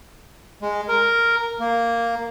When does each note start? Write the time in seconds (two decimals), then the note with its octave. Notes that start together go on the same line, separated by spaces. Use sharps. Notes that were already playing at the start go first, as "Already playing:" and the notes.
0.62 G#3
0.88 A#4
1.60 A#3